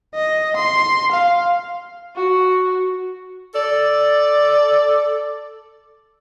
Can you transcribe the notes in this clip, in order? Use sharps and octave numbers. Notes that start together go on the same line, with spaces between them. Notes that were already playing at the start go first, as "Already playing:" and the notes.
D#5
C6
F5
F#4
A4 D5